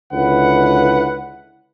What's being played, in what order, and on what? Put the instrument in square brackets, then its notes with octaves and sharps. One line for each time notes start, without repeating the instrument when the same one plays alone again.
[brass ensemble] C#2 D3 E4 B4 F#5